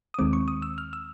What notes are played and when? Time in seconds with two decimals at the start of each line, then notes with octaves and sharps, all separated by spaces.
0.14 D#6
0.19 D#2 D#3 G#3 C4 D6
0.33 C#6
0.48 D#6
0.62 E6
0.78 F6
0.93 E6